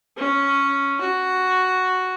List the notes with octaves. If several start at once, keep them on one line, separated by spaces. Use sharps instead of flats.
C#4
F#4